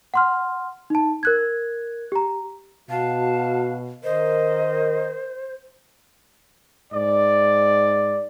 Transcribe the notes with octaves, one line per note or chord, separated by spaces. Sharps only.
F#5 C6 F6
D#4 A5
A#4 F#6 G#6
G4 A#5
B2 F#4 F5 A5
D#3 A#4 C5 D#5
G#2 D5